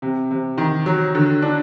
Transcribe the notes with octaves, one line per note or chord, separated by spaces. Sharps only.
C3
C3
D#3
F#3
D3
D4